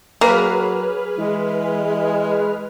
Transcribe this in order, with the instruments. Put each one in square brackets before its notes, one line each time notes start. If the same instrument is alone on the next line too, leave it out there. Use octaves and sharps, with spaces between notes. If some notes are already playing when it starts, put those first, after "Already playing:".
[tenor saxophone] F#3 [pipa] A#3 [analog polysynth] G#4 B4 F6
[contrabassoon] E3 [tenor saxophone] G#3